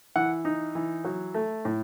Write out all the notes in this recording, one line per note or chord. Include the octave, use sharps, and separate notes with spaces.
E3 F#5
D#4
E3
F#3
A3
A2